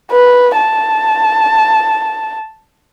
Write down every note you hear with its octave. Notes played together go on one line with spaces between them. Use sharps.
B4
A5